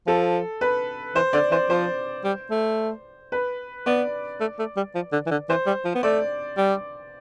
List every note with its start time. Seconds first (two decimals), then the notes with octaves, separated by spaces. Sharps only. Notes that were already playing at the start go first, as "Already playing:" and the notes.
0.07 F3 A4
0.61 B4
1.15 E3 C5
1.33 D3 D5
1.51 E3 C5
1.70 F3 C5
2.25 G3
2.51 A3
3.32 B4
3.86 B3 D5
4.41 A3
4.59 A3
4.77 G3
4.95 F3
5.13 D3
5.27 E3
5.31 D3
5.49 E3 C5
5.67 G3
5.85 F3
5.95 B3
6.03 A3 D5
6.58 G3